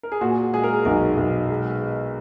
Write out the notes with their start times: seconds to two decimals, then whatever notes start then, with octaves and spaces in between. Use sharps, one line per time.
0.03 A#4
0.12 G#4
0.21 A#2 F#4
0.53 G#3 G#4
0.64 A#4
0.74 G#4
0.85 B1 F#4 A#4
1.17 B1
1.50 G#3